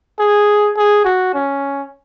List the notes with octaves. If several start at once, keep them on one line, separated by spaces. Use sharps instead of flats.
G#4
G#4
F#4
C#4